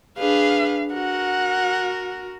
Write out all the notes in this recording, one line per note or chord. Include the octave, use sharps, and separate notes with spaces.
D4 G#4 B4 F5
F#4 A#4 F#5